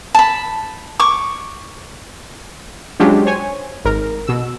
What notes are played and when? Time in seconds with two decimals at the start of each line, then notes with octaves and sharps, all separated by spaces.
0.15 A5 B5
1.00 C#6 D6
3.00 F#3 G#3 C#4 D4 F4 G4
3.25 C5 C#5 G#5
3.84 G#1 A#4
4.27 B2 E6